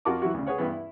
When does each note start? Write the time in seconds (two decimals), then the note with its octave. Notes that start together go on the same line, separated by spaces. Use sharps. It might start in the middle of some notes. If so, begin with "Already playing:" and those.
0.05 F2 F4 F#4 A#4 A5 D6
0.22 E3 F#3 E4 F#4
0.34 D2 C#3
0.46 G#4 B4 C#5 F#5
0.58 G2 E3 B3
0.73 E4